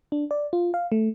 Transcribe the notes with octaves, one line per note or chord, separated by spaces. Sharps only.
D4
D5
F4
F5
A3